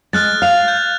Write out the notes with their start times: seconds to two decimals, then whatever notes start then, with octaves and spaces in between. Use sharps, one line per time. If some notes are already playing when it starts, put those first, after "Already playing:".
0.13 G#3 F6 F#6 A6
0.42 F5 F6 F7
0.68 G6